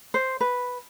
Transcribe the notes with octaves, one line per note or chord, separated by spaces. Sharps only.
C5
B4